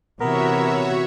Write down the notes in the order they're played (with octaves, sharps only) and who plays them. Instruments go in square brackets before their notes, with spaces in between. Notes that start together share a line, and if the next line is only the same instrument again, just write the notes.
[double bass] C3 E3 [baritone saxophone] B3 [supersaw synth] F#4 C#5 E5 [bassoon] A#4